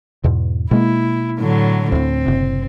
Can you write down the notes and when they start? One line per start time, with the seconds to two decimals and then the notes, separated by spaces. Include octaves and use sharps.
0.24 E2 G#2 B2
0.71 B2 G#3 A#3 E4
1.39 A2 D3 F#3
1.92 D2 A2 C4
2.26 F#1 C3